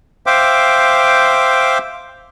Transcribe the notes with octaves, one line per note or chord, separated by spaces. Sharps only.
C5 E5 F5 G5 D6